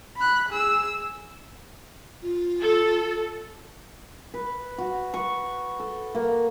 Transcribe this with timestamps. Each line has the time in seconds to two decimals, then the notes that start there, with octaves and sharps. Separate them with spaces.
0.17 B5 F#6
0.49 G#4 E6
2.22 F4
2.62 A4
4.34 B4
4.78 F#4
5.14 C#6
5.80 A4
6.15 A#3